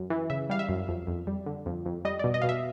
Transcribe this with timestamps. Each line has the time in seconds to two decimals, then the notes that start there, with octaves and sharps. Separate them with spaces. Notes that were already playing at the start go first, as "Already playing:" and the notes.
Already playing: F#2
0.10 E3
0.30 C#3 E5
0.50 G3 F5
0.59 E5
0.69 F#2
0.88 F2
1.07 F2
1.27 G3
1.46 D3
1.66 F2
1.85 F2
2.05 G3 D#5
2.19 B2 D5
2.34 D#5
2.42 B2 F5
2.49 E5